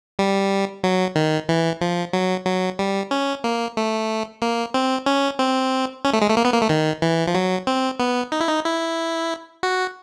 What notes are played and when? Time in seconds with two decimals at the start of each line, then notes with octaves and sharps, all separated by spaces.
0.19 G3
0.84 F#3
1.16 D#3
1.49 E3
1.81 F3
2.13 F#3
2.46 F#3
2.79 G3
3.11 C#4
3.44 A#3
3.77 A3
4.42 A#3
4.74 C4
5.06 C#4
5.39 C4
6.05 C#4
6.13 A3
6.21 G#3
6.29 A3
6.37 A#3
6.45 B3
6.54 A#3
6.62 A3
6.69 D#3
7.02 E3
7.27 F3
7.35 F#3
7.67 C4
8.00 B3
8.32 D#4
8.40 E4
8.48 D#4
8.65 E4
9.63 F#4